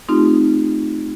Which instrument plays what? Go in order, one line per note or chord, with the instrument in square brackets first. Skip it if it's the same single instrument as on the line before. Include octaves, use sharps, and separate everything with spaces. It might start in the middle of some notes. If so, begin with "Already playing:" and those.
[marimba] A3 C4 D#4 F4 G4